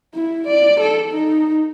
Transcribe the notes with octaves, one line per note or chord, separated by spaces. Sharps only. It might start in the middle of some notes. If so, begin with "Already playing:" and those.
E4
D5
A4
D#4